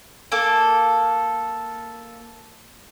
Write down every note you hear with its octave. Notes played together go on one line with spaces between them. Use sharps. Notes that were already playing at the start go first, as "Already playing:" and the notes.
A#3 A4